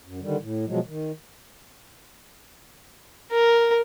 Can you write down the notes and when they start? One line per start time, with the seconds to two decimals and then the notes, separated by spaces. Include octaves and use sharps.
0.05 F#2
0.22 D3 D#3 G3
0.41 A2
0.68 B2 F3 F#3 G#3
0.87 D#3
3.32 A#4